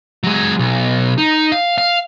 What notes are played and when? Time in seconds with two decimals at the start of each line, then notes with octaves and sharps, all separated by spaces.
0.24 F#3 G#3
0.59 B1
1.18 D#4
1.52 F5
1.78 F5